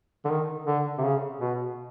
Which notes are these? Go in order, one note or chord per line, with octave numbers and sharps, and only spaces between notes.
D3
D#3
D3
C3
C#3
B2